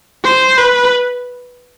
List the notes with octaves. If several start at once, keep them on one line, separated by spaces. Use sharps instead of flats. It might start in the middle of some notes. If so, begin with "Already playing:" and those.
C5
B4